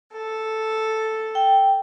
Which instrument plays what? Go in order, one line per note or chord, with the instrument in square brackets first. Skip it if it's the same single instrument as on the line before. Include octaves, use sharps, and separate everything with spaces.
[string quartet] A4
[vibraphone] G5